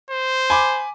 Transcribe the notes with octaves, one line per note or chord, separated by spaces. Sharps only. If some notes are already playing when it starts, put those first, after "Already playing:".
C5
G#5 B5 D6